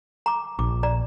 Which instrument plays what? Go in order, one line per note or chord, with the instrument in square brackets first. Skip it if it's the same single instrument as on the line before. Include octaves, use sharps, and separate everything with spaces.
[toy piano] A#5 D6
[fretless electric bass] A#1 [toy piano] D6
[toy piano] D5 A#5